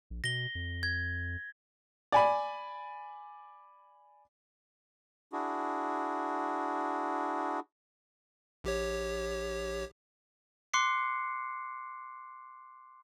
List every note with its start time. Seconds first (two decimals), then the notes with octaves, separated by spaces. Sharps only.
0.10 A#1
0.24 B2 A#6 G7
0.55 F2
0.83 G#6
2.12 D5 G#5 B5
5.33 D4 E4 F#4 G#4
8.64 A#1 G4 C#5
10.74 C6 D6 F#6 C7 C#7